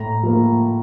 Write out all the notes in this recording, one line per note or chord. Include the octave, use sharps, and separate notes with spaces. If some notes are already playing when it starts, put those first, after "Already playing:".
Already playing: A2 A#5
F3 A#3